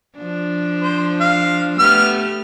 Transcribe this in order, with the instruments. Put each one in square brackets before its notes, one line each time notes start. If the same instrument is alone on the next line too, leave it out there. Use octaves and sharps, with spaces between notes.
[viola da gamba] F3 D4
[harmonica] C5
F5
[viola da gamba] A3 G4 [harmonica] B3 F6